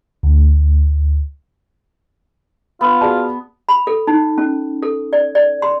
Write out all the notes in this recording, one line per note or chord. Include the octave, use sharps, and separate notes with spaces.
D2
B3 F4
F#4 G#4 D5 A5
B5
A4
D#4
C#4
A4
D5
D5
C6